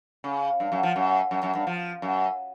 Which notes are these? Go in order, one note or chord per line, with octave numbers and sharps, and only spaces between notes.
C#3
G2
F#2
F3
F#2
F#2
F#2
G2
F3
F#2